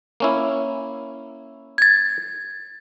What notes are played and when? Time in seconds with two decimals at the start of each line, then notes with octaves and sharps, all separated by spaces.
0.20 A#3 C#4 E4
1.78 G#6 A6